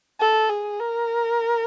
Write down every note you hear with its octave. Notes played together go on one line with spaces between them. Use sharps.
A4
G#4
A#4